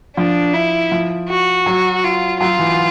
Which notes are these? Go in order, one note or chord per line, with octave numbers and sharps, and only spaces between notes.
F3 D4
E4
F3
F#4
F#3
F4
F#3 F4
E3